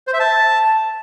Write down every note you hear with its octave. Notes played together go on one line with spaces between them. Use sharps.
C5
E5
A5